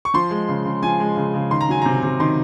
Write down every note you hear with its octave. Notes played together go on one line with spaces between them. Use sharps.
C#6
F3 C6
G#3
C#3
C#3
F3 G#5
G#3
C#3
C#3
D#3 C6
A#5
F#3 G#5
C3 A#5
C3
D#3 C6